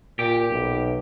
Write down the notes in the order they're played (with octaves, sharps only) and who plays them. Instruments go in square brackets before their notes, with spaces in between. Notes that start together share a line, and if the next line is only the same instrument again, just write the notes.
[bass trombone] A#2 [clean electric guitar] G4
[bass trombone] B1